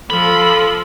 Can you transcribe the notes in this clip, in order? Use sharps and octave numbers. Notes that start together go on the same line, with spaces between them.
F3 A4 B5